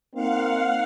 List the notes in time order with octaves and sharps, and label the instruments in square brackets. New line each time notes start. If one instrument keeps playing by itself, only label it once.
[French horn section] A#3 C4 D#4 [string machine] F5 F#5